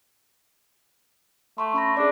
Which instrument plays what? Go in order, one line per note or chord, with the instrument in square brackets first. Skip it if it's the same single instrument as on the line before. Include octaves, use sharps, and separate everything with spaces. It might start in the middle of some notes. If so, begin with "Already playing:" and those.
[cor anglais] A3 [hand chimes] C6 C#6
[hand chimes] C#4 B5 A#6
[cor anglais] D4 [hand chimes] G#4 D5